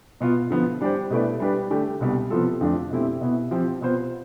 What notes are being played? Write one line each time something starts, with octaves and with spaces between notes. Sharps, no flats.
B2 B3 F4
D3 F3 B3
G3 D4 G4 C5
B2 A3 E4 B4 D5
G3 D4 G4 B4
D3 A3 D4 G4
C2 B2 G3
C3 F3 B3 F4 A4
F2 D3 F3 A3 D4
B2 A3 C4 E4 G4
B2 B3 E4
F3 C4 G4
B2 B3 F4 C5